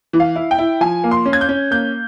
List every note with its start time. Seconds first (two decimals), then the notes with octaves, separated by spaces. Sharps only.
0.13 E3
0.20 F5
0.36 E4
0.51 G5
0.58 E4
0.81 F3 G#5
1.04 A#3
1.11 C6
1.26 C#4
1.33 G#6
1.41 G6
1.49 C#4
1.71 A#3 G6